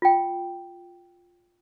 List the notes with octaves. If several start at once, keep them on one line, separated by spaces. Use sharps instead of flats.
F4 G5